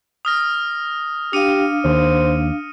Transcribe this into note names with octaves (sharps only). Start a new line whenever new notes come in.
D#6 F6 A#6
D4 G4 F5 C#7 D#7
D#2 C5